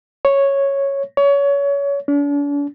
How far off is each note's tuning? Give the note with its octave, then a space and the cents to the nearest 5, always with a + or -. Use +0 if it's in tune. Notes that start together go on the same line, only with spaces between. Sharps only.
C#5 -5
C#5 +25
D4 -45